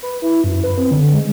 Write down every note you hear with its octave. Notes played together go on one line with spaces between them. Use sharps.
B4
E4
F#2
B4
C4
D3
G#3